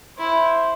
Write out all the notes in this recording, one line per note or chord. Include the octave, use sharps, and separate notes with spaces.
E4 C5